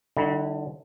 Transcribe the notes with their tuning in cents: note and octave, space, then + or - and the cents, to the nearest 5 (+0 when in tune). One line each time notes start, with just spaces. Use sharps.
D3 +20 G3 -35 E4 -40